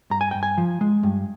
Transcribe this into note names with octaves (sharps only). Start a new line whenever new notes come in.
G2 A#5
G#5
G2 G5
G#5
F3
G#3
G2